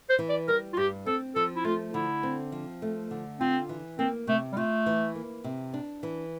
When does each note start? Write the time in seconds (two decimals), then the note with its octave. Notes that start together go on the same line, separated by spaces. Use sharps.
0.09 C5
0.19 E3
0.29 D5
0.48 G3 A#4
0.73 F4
0.77 G2 G4
1.06 C4 A4
1.35 F3 A4
1.56 E4
1.65 A3 F4
1.94 D3 E4
2.23 C4
2.52 F3
2.82 A3
3.11 D3
3.40 C4 F4
3.69 E3
3.98 A#3 C4
4.27 C3 A3
4.52 G3
4.57 A3 F4
4.86 E3
5.15 A#3
5.44 C3
5.74 D4
6.03 E3